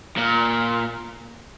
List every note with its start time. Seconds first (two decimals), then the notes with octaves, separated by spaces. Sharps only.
0.18 A#2